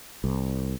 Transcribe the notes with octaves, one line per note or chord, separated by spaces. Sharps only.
C2